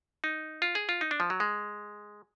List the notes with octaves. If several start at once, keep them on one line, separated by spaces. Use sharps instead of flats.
D#4
F4
G#4
F4
D#4
D4
F3
F#3
G#3